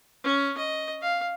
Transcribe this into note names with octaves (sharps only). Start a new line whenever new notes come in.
C#4
D#5
F5